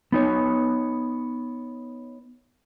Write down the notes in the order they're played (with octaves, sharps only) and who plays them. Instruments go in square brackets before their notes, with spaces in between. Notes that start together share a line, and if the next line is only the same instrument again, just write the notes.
[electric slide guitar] B3 D#4 C#5